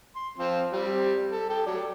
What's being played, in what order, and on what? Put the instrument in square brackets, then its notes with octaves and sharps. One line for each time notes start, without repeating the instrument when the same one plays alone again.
[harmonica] C6
F3 C4
G3 C4
A4
G4 A4
F#3 D5